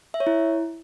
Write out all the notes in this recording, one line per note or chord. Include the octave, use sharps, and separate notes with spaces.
E5
C#5
E4